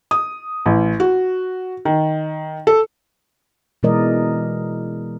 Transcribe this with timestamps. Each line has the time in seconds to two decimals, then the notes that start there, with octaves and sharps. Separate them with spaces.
0.11 D#6
0.66 A1
1.00 F#4
1.85 D#3
2.67 A4
3.83 B2 E3 G#3 A#4 D5 D#5